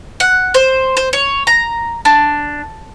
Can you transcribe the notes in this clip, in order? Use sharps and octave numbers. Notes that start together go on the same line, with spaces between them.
F#5
C5
C5
C#5
A#5
D4